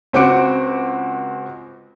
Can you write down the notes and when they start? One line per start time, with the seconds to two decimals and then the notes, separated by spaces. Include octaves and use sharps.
0.13 C#2 C4 F#4 D6 C#7